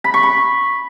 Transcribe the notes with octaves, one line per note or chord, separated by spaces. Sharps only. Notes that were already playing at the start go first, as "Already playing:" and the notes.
B5
C#6
B5